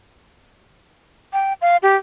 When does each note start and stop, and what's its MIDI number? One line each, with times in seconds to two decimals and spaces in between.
1.33 1.53 79
1.62 1.77 77
1.83 1.96 67